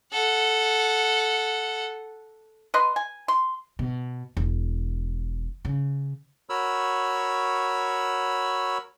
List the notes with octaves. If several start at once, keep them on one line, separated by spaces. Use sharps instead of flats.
A4 F#5
B4 D#5 C6
G#5
C6
B2
E1
C#3
F#4 A#4 C#5 B5 E6